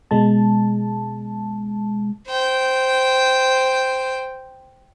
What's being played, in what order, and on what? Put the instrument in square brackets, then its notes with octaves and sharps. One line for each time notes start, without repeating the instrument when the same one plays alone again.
[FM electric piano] B2 G#3 A5
[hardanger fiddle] C5 G5